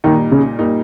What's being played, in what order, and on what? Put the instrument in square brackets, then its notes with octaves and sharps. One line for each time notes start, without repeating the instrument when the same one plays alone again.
[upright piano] A#2 G3 A#3 D#4 [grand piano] D#3
[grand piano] C#3
[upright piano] A#2 G3 A#3 D#4